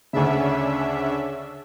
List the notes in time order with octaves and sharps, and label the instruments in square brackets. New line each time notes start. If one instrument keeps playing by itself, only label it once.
[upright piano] D2 C#3 [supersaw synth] C#4 D4 E5